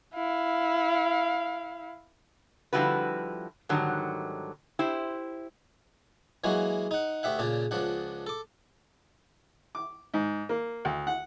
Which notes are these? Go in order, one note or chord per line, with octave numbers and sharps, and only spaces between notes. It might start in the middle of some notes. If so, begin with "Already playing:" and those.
E4 F5
D3 F3 G3 E4 F#4 B4
G#2 D3 D#3 F#3 G3
E4 G4 C5
E3 F#3 G#3 A#3 F#4
D#4 F#5
D2 G4 E5 F#5
A#2 C#3 D4 A5
C#2 F3 D4 F#5
A4 D6
D6
G#2
A#3
D2
F#5